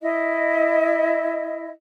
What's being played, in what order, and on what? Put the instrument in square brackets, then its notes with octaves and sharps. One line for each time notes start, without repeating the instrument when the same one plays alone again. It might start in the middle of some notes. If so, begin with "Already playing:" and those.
[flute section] E4 D#5